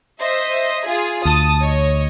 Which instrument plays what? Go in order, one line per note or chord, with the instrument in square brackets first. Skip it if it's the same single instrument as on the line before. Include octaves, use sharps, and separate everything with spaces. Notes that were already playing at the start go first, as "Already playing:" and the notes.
[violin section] C5 D#5 E5
F4 G#4
[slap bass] D2 [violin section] A5 D#6
[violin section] C#5 D#5